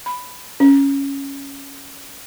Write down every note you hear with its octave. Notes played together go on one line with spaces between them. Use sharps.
B5
C#4